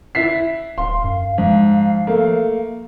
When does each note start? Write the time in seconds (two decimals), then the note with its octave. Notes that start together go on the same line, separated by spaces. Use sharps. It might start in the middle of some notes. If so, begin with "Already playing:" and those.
0.15 E4 B6 C7
0.78 D1 F5 C6
1.04 F#2
1.38 G#2 F3 F5
2.07 A3 A#3